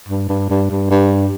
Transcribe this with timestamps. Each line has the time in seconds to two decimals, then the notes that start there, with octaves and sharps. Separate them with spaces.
0.08 G2
0.29 G2
0.50 G2
0.70 G2
0.90 G2